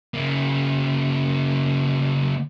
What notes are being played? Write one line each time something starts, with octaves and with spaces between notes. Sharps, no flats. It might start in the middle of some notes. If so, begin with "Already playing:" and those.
C#3 A#3